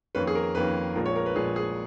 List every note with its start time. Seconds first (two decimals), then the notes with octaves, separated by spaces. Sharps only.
0.15 F2 D#3 A#3 C#4 B4
0.27 G#4
0.35 A#4
0.55 F2 D#3 A#3 C#4 B4
0.96 A#1 A#2 F3 G#3 A#4
1.06 C#5
1.16 A#4
1.26 B4
1.36 A#1 A#2 F3 G#3 G#4
1.56 G#4